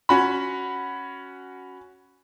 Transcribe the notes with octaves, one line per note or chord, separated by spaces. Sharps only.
C#4 F#4 B5